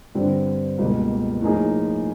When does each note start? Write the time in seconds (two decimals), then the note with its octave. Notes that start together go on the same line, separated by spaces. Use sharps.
0.15 G2 D3 G3 C4
0.78 C#2 B2 G3 A#3
1.41 A2 F3 A#3 D#4 G#4